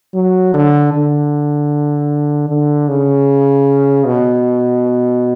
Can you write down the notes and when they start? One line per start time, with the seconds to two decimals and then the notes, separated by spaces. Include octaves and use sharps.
0.15 F#3
0.54 D3
0.93 D3
2.49 D3
2.88 C#3
4.06 B2